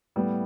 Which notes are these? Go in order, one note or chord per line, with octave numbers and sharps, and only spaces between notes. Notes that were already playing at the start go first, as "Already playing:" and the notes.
A2 G3 B3